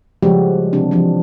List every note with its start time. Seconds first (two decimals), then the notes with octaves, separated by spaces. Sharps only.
0.23 C#3 F3 G3 G#3 F#4 G4
0.73 C3 E3 C4 D4
0.91 E3 F3 D4